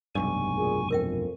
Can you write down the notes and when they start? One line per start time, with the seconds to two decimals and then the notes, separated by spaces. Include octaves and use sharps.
0.15 F1 B1 G2 G#5 C#6
0.57 A#2 G#4
0.91 F2 A#4 E5 G5